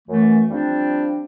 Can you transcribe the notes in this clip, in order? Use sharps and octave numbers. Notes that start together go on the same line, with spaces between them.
F#2 E3 A3
F3 G3 C4 D4